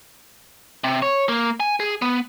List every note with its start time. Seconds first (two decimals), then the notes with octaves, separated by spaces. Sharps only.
0.84 C3
1.02 C#5
1.29 A#3
1.60 G#5
1.80 G#4
2.02 B3